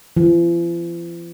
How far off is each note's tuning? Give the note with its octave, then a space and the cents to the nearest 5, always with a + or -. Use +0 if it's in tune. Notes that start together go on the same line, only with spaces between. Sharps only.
F3 -45